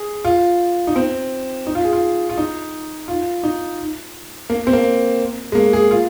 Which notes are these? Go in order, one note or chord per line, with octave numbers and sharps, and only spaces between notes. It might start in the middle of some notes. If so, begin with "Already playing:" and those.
Already playing: G#4
F4
D#4
C4
D#4
F4
G#4
F4
F4
D#4
F4
D#4
A#3
C4
A#3
G#3
A#3
G#4
F4